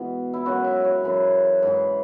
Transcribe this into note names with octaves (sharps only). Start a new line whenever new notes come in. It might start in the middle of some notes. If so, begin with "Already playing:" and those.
Already playing: G#2 B2 E3 G#3
E4
F#2 C#3 G#3 F#4
E5
C#5
F#2 C#3 E3
G#2 E3 G#3